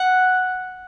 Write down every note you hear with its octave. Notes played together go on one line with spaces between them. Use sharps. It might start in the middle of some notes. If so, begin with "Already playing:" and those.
Already playing: F#5